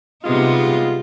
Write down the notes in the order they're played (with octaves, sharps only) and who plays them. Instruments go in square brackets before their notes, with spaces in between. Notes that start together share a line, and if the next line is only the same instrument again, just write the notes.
[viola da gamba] C3 B3 D#4 [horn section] G3 G#3 F4